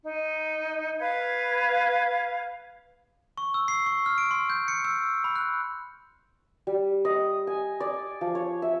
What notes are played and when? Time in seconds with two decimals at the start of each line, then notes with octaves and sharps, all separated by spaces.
0.03 D#4
1.00 B4 F5 G#6
3.38 C#6
3.54 E6
3.68 C7
3.86 C#6
4.06 F6
4.18 D7
4.31 C6
4.50 G6
4.68 C#7
4.85 E6
5.24 B5
5.36 F#6
6.67 G3
7.05 D#5
7.47 G#5
7.80 D5
8.21 F3
8.35 C#5
8.62 E5